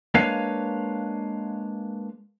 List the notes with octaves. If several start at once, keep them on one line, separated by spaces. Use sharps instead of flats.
G#3 A#3 D4 B4 C#5 F5